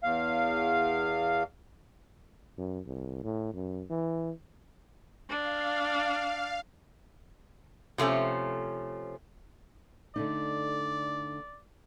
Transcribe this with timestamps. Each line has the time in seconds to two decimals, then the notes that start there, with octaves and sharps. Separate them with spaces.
0.03 E2 F5
2.58 F#2
2.86 C2
3.23 A2
3.54 F#2
3.90 E3
5.29 D4 F5
7.98 C3 F3 A3 C#4
10.16 D3 A3 D#4 D5